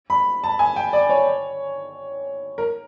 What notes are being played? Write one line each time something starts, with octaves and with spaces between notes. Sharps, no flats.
B5
A5
G#5
G5
D5
C#5
A#4